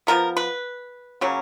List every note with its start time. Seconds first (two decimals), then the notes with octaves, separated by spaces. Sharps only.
0.07 F3 G#3 B3 A#4
0.37 B4
1.21 C#3 F#3 A#3 C#4